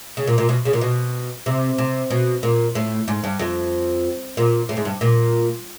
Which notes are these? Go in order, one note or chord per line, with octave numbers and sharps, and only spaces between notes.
C#3
A#2
A#2
B2
C#3
A#2
B2
C3
C3
B2
A#2
A2
G#2
G2
F2
A#2
A2
G#2
G2
A#2